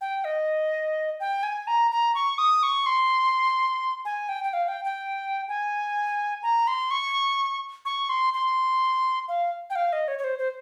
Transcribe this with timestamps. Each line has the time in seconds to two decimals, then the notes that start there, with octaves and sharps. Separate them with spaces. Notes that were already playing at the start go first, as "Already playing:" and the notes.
0.01 G5
0.24 D#5
1.20 G5
1.43 G#5
1.67 A#5
1.91 A#5
2.15 C#6
2.38 D#6
2.63 C#6
2.86 C6
4.05 G#5
4.29 G5
4.44 G5
4.53 F5
4.68 G5
4.84 G5
5.48 G#5
6.43 A#5
6.67 C6
6.91 C#6
7.85 C#6
8.09 C6
8.33 C6
9.28 F5
9.70 G5
9.75 F5
9.92 D#5
10.08 C#5
10.18 C#5
10.24 C5
10.38 C5